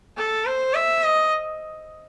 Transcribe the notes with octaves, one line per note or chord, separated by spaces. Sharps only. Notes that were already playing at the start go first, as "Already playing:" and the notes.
A4
C5
E5
D#5